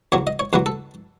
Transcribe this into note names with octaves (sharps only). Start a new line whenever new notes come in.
E2 C#3 F#3 C#5
D#5
C#5
E2 C#3 F#3 B4
A4